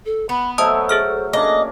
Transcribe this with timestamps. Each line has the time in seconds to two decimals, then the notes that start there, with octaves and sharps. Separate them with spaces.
0.06 A4
0.29 B3 B5
0.58 F#3 A3 C5 D#5 E5 A5 D#6
0.89 G#4 A4 F6
1.33 A#3 C#4 D4 D#5 D6